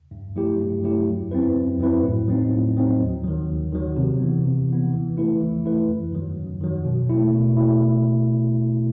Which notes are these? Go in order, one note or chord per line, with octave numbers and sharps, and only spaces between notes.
G2
F#3 A3 E4 G4
G2
F#3 A3 E4 G4
F#2
F#3 C4 E4 B4
F#2
F#3 C4 E4 B4
A2
F#3 C4 D#4
A2
F#3 C4 D#4
D#2
D#3 F#3
D#2
D#3 F#3
C3
E3 B3
C3
E3 B3
E3
A3 E4 B4
E3
A3 E4 B4
F#2
D#3 F#3
F#2
D#3 F#3
B2
A3 E4
B2
A3 E4